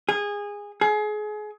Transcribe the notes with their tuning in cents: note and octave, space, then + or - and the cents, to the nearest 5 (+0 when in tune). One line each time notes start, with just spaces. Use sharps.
G#4 -20
G#4 +30